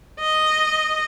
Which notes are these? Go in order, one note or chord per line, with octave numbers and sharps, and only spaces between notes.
D#5